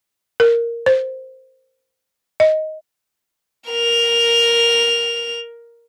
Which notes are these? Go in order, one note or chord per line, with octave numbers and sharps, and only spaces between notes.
A#4
C5
D#5
A#4 F7